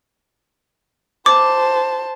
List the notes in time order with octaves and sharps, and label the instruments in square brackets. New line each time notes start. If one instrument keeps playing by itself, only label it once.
[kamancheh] C5 A5 [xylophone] D6